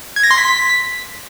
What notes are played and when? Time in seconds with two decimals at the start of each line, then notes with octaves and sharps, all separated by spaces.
0.16 G#6
0.23 A#6
0.31 C6
0.38 B6